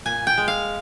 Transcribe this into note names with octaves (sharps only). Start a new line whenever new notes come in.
A#2 G#5
G5
G#3
F5